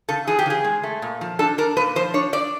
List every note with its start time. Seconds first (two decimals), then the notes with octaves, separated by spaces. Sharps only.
0.09 C#3 A4
0.27 E3 G#4
0.39 G4
0.46 C#3 G#4
0.64 G#3
0.83 A3
1.02 A#2
1.21 F3
1.39 D4 A4
1.58 D4 A#4
1.77 A#2 B4
1.96 F3 C5
2.14 D4 C#5
2.33 D4 D5